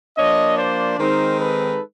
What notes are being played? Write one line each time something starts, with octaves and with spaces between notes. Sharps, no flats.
F3 A#3 D4 C#5 D#5
C5 D5
D#3 G#3 C4 D#4 A#4 C5
A4 B4